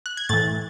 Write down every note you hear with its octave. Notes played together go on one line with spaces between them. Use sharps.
F#6
G#6
A2 E3 A6